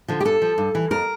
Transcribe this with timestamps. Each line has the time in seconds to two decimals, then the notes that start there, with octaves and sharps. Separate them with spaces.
0.08 D3 F3
0.20 G4
0.25 G2 A4
0.42 F3
0.58 G2
0.75 E3
0.91 F2 A#4